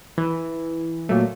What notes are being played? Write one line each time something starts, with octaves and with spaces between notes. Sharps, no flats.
E3
A#2 F#3 A3